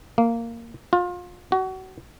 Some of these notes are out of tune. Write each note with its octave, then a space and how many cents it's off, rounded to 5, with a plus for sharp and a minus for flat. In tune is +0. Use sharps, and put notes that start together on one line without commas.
A#3 -10
F4 +30
F#4 +30